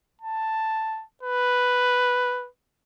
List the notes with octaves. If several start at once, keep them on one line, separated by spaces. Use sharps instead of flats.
A5
B4